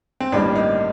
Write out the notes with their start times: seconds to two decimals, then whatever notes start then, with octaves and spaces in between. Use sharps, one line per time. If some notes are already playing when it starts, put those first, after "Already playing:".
0.20 C4
0.32 A1 G2 D#3 G3 A#3 D4
0.55 D#4